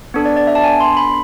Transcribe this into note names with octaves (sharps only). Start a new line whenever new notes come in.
B3 D4 A4
D5
D5
E5
A5
G#5
C6
B5